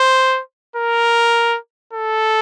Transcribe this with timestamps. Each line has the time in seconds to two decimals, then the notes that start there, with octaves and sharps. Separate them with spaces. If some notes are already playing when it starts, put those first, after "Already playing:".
Already playing: C5
0.76 A#4
1.93 A4